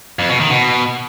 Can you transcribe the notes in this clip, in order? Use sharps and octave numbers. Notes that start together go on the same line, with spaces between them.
F2
B2
D#3
B2